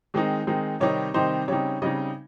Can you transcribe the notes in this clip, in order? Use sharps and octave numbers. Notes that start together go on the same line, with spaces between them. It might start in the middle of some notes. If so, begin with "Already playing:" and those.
D#3 G#3 C4 D#4
D#3 G#3 C4 D#4
C3 D#3 G3 C4 D#4 C#5
C3 D#3 G3 C4 D#4 C5
C#3 G3 C4 D#4 C#5
C#3 G3 C4 D#4 D#5